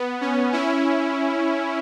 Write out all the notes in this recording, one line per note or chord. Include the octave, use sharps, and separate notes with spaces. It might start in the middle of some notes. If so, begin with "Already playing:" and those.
Already playing: B3
C#4
C#4 E4